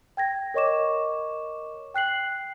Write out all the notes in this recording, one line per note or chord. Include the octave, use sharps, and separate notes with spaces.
G5 G#6 A#6
A#4 C#5 D#5 C#6 D6 E7
G5 F#6 C7 F#7